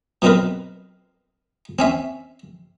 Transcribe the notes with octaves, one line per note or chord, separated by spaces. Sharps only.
B2 F#3 C4 D#4 A#4 B4
C4 C#4 E5